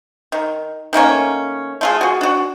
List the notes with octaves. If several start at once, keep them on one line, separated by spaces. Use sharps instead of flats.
D#3
D#3 A3 A#3 C#4
A3 F4 G#4
F#4 G#4
D4 F#4